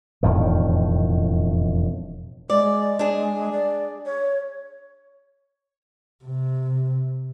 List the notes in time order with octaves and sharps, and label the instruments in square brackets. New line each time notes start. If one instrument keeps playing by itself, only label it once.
[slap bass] E1 F2 A2 D#3
[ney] G#3 [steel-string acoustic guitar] D5
[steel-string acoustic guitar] D4 G#4
[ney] D5
C#5
[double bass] C3